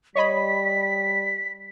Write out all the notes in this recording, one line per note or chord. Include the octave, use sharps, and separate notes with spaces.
G3 C#5 D#5 B5 B6